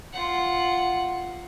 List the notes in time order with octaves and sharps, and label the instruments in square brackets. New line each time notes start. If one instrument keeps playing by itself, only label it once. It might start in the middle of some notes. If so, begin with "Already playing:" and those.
[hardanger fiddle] F4 F#5